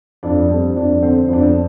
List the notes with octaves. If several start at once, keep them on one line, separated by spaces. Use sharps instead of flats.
F2 D4
G3 C4
F2 D4
D3 C4
F2 D4
C4